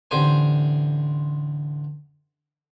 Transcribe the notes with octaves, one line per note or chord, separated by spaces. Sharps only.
A1 D3 G4 C5 G#5